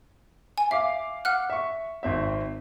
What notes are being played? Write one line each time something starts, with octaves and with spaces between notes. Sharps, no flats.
G#5
E5 F5 D6 C7
F#5 F6 F#6
E5 C#6
G#1 C4 E5